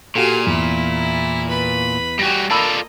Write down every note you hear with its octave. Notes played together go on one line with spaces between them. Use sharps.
A#2 F#4 G4 A4 F5 G#5
E2 E4
B4 B5
G3 F#4 G4 G#5 A#6
A#3 F4 A4 D5 D#5 A5 B5 E6